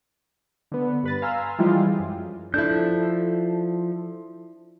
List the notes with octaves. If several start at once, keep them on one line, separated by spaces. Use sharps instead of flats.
D3 B3
G2 B4 A6
F5 G#5 A#5 C6 E6 F6
E3 F3 G3 G#3 E4 F4
F#2
F3 D4 E4 A4 G6